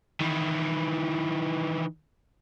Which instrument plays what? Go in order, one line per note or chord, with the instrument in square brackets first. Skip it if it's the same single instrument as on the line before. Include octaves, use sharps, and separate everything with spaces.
[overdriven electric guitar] D#3 E3